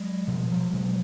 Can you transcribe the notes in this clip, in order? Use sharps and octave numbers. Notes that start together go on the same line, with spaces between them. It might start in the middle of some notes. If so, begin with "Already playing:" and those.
Already playing: F#3 G#3
B2 F3 G3
G#3
F3 G3
B2 F#3 G#3